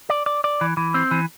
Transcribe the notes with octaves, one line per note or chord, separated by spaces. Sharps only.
D5
D5
D5
E3
E3
C4
E3